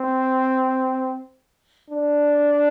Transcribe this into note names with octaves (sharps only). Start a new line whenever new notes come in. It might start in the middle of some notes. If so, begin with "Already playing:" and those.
Already playing: C4
D4